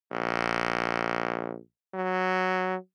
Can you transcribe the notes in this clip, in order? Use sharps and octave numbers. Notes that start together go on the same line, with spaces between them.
A#1
F#3